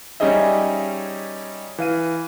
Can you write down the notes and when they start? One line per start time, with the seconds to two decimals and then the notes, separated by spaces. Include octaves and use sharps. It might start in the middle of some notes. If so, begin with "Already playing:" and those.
0.20 G3 C#4 D#4 G#4 D#5 E5
1.78 E3 F5 D#7